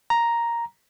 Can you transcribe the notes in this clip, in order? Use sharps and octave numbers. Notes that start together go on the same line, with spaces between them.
A#5